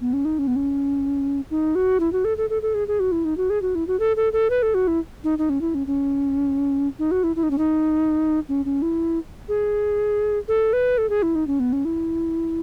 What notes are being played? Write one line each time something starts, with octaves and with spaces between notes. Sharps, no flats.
B3
C#4
D#4
C#4
B3
C#4
D#4
F#4
E4
F#4
A4
A4
A4
A4
G#4
G#4
F#4
E4
D#4
F#4
G#4
F#4
E4
F#4
A4
A4
A4
B4
A4
F#4
E4
D#4
D#4
C#4
E4
C#4
C#4
D#4
F#4
E4
E4
D#4
C#4
D#4
C#4
C#4
E4
G#4
A4
B4
A4
G#4
E4
D#4
C#4
B3
C#4
E4